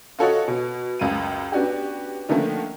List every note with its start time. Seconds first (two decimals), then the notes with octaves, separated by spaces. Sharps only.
0.19 F4 F#4 A4 C#5 D#5 F#5
0.48 B2
0.99 C#2 F#2 F5 D#7
1.52 B3 C#4 D4 F#4 G4
2.29 D3 D#3 F3 A3 A#3 C#4